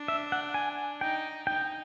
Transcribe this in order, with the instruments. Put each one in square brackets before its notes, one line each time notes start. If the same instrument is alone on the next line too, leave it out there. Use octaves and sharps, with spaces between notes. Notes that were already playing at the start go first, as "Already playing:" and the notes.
Already playing: [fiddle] D4
[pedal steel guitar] E5
F#5
G#5
[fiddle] D#4 [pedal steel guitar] G5
[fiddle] D#4 [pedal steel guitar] G5